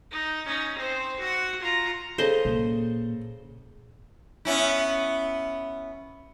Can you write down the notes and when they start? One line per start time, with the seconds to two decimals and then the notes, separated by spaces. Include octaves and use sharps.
0.11 D#4
0.46 C#4 D#4
0.77 C4 C5
1.19 F#4 F#5
1.61 F4 A#5
2.18 C#3 A4 C5 D#5
2.45 A#2
4.45 B3 C#4 E4